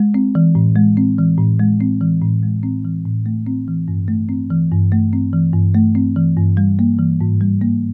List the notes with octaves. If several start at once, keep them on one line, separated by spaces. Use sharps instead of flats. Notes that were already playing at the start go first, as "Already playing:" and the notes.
Already playing: G#3
C4
E3
A2
G#3
C4
E3
A2
G#3
C4
E3
A2
G#3
C4
E3
A2
A3
C4
E3
G2
A3
C4
E3
G2
A3
C4
E3
G2
A3
C4
E3
G2
G3
A#3
E3
G#2
G3
A#3